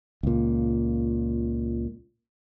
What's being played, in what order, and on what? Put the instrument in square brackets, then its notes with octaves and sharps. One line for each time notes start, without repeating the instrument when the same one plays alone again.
[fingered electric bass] C#2 A#2